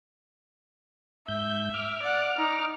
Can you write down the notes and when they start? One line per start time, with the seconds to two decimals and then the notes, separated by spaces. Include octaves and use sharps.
1.28 G#2 E5 G6
1.74 D6 F6
2.03 D5 F#5
2.38 D#4